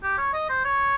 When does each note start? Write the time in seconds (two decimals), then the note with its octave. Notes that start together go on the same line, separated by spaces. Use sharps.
0.03 G4
0.18 C#5
0.34 D#5
0.49 C5
0.65 C#5